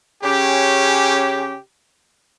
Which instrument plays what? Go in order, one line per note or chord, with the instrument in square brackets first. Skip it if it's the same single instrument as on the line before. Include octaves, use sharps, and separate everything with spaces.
[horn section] C#3 C#4 G4